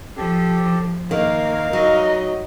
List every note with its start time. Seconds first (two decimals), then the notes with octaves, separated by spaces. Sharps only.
0.17 F3 G4 A4
1.11 D#3 A#3 A#4 F5
1.73 F#3 D#4 D#5